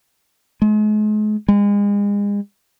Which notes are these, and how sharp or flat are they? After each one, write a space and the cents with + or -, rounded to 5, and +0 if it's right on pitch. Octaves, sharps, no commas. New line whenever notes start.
G#3 +40
G#3 -35